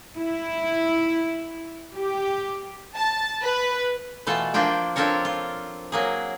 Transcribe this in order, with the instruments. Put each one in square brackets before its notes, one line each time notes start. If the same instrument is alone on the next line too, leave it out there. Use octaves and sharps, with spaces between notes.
[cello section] E4
G4
[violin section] A5
B4
[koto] B2 E3 A3 F4 A4 A5
F3 A#3 D4 F4 G5
C4 D4 F4 A4 A#4 C#5
F4
F#3 A#3 G#4